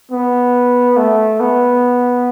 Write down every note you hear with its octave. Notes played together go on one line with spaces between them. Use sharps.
B3
A3
B3